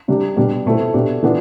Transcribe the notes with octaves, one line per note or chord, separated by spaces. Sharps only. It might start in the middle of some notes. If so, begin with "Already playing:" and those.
C3 G3 D4 G4
B2 G3 D4
B2 A3 C4 E4
B2 A3 D4 G4
E3 B3 D4 F4